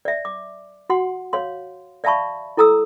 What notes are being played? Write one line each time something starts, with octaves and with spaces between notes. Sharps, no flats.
D5 E5
D6
F#4 F#5 C6
C#5 F5 C6
D5 E5 F5 A5 B5 C#6
E4 A4 A#5 D#6 E6